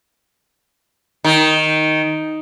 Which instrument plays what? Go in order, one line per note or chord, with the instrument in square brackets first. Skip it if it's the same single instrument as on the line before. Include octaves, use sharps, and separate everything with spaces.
[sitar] D#3